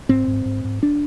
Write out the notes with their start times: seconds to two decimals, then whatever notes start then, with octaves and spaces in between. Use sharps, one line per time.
0.09 G#2 C4
0.28 G#2
0.45 G#2
0.65 G#2
0.83 D4